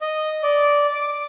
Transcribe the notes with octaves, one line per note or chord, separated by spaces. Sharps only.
D#5
D5
D6